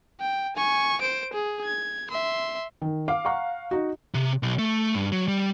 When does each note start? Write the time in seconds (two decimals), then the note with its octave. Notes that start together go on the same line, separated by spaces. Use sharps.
0.20 G5
0.56 G#5 C#6
1.01 C5 D7
1.33 G#4
1.64 G#6
2.11 E5 C6
2.82 D#3
3.08 F5 D6
3.25 F#5 A#5 C#6
3.71 D#4 F#4
4.14 C3
4.43 B1
4.59 A3
4.94 G2
5.12 F#3
5.28 G3